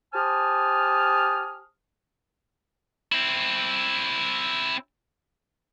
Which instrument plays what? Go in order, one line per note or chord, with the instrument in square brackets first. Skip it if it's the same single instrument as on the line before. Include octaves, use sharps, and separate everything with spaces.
[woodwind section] G4 C5 G#5 A5 D#6 F6
[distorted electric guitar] C4 E4